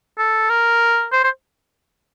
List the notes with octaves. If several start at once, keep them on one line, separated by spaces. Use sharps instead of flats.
A4
A#4
C5
C5